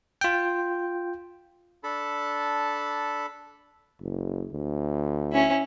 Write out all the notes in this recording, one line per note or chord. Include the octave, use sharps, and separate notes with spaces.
F4 G5
D4 A4 A5 B5
F#1
D2
C#4 E4